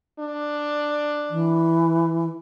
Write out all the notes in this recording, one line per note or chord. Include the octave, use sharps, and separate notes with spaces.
D4
E3